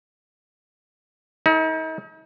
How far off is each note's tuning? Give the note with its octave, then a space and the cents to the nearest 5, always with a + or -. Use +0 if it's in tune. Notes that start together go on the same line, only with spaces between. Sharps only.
D#4 +40 A4 +0